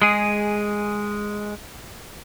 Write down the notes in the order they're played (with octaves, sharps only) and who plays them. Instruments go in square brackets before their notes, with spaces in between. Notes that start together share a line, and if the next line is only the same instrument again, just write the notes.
[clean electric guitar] G#3 G#4